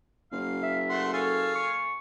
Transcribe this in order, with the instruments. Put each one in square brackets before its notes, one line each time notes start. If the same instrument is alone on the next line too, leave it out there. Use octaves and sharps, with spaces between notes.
[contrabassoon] F#1 [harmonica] F5
[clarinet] E5
[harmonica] A3 F#5 C6
[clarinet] A4 [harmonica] C#5 F5 G#5
[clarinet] C#6